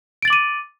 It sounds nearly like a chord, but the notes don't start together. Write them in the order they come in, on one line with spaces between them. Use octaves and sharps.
D7 A6 F#7 D6 D#7